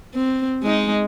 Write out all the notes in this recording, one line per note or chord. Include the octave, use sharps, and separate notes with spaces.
C4
G#3 D#4